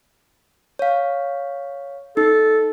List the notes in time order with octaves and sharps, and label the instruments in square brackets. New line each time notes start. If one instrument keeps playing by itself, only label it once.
[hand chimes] C#5 F5
[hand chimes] D#4 [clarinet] A4